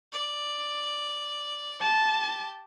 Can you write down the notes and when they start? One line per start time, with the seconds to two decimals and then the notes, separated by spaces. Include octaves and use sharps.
0.12 D5
1.81 G4 A5